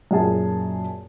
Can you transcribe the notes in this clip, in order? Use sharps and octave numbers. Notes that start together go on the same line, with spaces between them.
F#2 A#2 G#4 A5